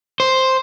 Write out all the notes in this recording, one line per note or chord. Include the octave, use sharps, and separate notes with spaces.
C5